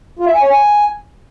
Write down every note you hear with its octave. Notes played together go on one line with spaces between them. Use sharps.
F4
E5
G#5
C#5
G#5